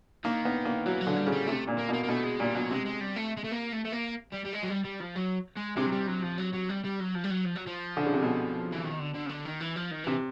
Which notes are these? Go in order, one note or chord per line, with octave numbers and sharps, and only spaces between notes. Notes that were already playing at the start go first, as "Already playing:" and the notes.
D#3 A#3
B3
A#3
E3 F#3
F#3
D3
G3
C#3
G3
C3 A3
A#2
A#3
B2 A#3
A#3
B2 A3
G#3
A#2 G3
B2 F#3
C3 G#3
G#3
G3
A3
G#3
A3
A#3
A3
A3
A#3
G3
G3
G#3
F#3
G3
G3
F3
F#3
G#3
C3 G#3
F#3
G3
F#3
F3
F#3
F#3
G3
G3
F#3
F3
G3
F#3
F3
F#3
F3
D3
C#3
C3
B2
E3
D#3
D3
D3
C#3
D3
D#3
E3
F3
D#3
C3 E3